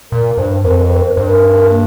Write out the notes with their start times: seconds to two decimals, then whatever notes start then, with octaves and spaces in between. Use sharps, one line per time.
0.11 A#2 A#4
0.38 G2 C5
0.65 F2 A#4
0.73 C5
0.81 A#4
0.88 C5
0.96 A#4
1.03 C5
1.11 A#4
1.17 G2 C5
1.27 A#4
1.70 A#3